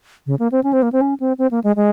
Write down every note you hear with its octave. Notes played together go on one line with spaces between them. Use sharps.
C#3
A#3
C4
C#4
C4
A#3
C4
C#4
C4
C4
A#3
G#3
G#3